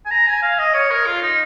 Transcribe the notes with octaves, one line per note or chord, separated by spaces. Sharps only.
G#5
A#5
G#5
F5
D#5
C#5
A#4
F4
D#4